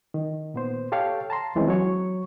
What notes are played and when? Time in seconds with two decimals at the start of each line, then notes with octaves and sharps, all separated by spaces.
0.14 D#3
0.54 A#2 B3 C5
0.92 G4 A4 C#5 F5 G5
1.30 A5 A#5 C6
1.55 D#2 E3 G#3 C4 C#4
1.68 F#3 C#5 C#6